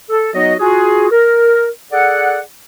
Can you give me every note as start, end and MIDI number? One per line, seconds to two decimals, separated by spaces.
0.09 0.31 69
0.35 0.53 54
0.35 0.53 59
0.35 0.53 63
0.35 0.53 66
0.35 0.53 73
0.35 0.53 75
0.60 1.07 65
0.60 1.07 66
0.60 1.07 68
1.11 1.67 70
1.92 2.39 68
1.92 2.39 69
1.92 2.39 74
1.92 2.39 78